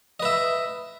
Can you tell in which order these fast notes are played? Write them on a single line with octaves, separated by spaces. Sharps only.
D#5 B4 E5